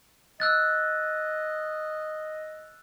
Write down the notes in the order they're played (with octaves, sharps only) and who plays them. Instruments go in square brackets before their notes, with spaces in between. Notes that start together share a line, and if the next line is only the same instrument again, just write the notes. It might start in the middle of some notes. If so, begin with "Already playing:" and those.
[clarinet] D#5 [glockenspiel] E6 F#6 A6